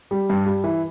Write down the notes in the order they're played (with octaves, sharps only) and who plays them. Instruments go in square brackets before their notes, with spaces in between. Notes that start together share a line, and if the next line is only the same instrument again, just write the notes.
[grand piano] G3
G2
G3
E3